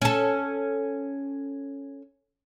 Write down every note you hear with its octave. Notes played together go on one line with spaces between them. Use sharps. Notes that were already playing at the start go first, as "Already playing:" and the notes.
C#4 A4